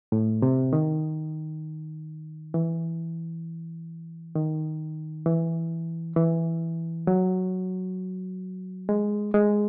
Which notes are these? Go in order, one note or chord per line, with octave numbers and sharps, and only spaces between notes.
A2
C3
D#3
E3
D#3
E3
E3
F#3
G#3
G#3